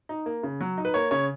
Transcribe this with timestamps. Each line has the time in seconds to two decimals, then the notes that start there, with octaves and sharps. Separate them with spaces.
0.09 D#4
0.26 A#3
0.43 C#3
0.61 F#3
0.78 D#4
0.85 B4
0.94 A#3 C#5
1.11 C#3 C#5